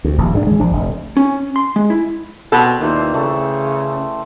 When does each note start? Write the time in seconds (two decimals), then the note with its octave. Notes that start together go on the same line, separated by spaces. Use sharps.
0.04 D2
0.18 D#1 A#1
0.33 G#2 D3 D4
0.47 E3 G#3
0.60 A#1 F3 D4
0.72 F1
1.17 C#4
1.56 C6
1.76 G#3
1.90 E4
2.52 B2 C4 A4 D5
2.81 D#2 A#2 E3 C5
3.14 C#3 A3